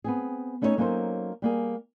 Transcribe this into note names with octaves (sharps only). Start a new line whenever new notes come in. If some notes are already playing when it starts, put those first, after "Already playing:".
B3 C4 G#4
A3 C#4 D#4 E4 A4 C#5
F#3 A#3 C#4 D#4 A4 C5
G3 A#3 G#4